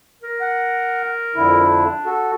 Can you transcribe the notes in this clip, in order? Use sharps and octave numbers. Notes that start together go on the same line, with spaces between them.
A#4
F#5
F2 D3 E4
D4
F#4 A4